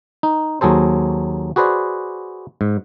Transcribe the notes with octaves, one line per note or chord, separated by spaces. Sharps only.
D#4
D#2 F#3 G#4 A4 C5
F#4 G#4 B4 C5 D5
G#2